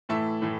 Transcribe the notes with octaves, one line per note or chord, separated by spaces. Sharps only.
A2 E3 A3 E5 A5
A2 E3 A3